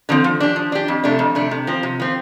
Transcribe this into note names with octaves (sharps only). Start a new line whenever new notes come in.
D3 F3 C4
F3
D4 G4
F3
D4 G4
F2
C3 A3 D4
F2
C3 A3 D4
C3
F3 C4
C3
F3 C4